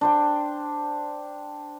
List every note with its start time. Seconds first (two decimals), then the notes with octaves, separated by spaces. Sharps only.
0.01 D4 C5 G5